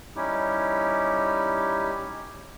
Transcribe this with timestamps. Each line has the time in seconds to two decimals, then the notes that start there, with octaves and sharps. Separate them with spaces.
0.16 G3 C#4 D#4 E4 G4